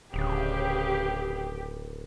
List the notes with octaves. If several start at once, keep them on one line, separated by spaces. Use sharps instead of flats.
D1 C#3 G4 G#4 B4